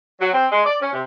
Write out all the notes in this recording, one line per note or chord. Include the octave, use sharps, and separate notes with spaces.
F#3
C4
G#3
D5
C#4
C3